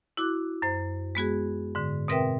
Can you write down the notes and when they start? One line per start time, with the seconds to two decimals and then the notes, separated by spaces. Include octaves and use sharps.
0.17 E4 F#4 D6 F#6
0.62 F#2 C5
1.15 G#3 B3 F#4 G#4
1.75 G#2 D3
2.08 B2 C4 A#4 B4 E5 G5